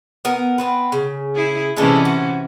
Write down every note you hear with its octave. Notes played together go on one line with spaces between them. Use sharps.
B3 A#4
B3 C4 B4
C#3
E4 G#4
C3 E3 G#3 C#4 D4 A4
F#4